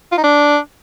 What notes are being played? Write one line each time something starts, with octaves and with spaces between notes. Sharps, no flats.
F4
D#4
D4